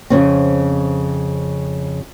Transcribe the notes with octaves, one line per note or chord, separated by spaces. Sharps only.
F2 C#3 C4